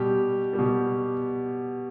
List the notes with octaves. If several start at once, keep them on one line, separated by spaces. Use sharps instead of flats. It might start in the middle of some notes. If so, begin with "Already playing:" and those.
Already playing: B2 G3 G4
G3
B2